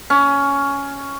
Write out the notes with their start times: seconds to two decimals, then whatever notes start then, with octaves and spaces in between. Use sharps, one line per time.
0.10 C#4